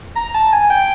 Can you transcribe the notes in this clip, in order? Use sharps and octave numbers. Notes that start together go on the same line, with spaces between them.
A#5
A5
G#5
G5